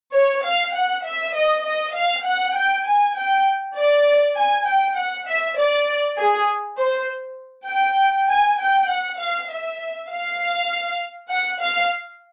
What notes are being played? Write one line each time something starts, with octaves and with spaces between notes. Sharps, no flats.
C#5
F5
F#5
E5
D#5
D#5
F5
F#5
G5
G#5
G5
D5
G#5
G5
F#5
E5
D5
G#4
C5
G5
G#5
G5
F#5
F5
E5
F5
F#5
F5